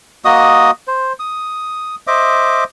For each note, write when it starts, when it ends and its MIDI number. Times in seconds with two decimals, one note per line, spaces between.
0.25 0.71 58
0.25 0.71 66
0.25 0.71 75
0.25 0.71 87
0.88 1.13 72
1.20 1.95 87
2.07 2.64 72
2.07 2.64 75
2.07 2.64 76
2.07 2.64 86